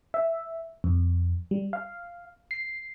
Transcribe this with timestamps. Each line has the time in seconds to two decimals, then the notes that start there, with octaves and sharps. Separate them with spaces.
0.14 E5
0.84 F2
1.51 G3
1.73 F5
2.51 C7